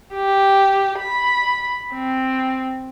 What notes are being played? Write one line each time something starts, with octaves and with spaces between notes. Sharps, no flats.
G4
B5
C4